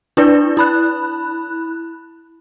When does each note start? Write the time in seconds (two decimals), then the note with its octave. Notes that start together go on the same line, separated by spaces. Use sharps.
0.17 D4 E4 B4 D5
0.57 E4 B5 F#6